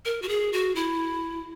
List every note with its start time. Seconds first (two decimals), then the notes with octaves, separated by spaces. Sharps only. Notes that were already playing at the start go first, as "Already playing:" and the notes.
0.05 A#4
0.22 F#4
0.29 G#4
0.53 F#4
0.75 E4